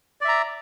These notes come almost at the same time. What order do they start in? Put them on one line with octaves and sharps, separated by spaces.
D5 E5 A#5